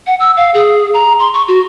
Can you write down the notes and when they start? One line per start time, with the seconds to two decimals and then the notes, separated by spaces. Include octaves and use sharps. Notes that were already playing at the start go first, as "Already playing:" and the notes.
0.07 F#5
0.20 E6
0.37 F5
0.54 G#4
0.94 A#5
1.20 C6
1.34 C#6
1.48 F#4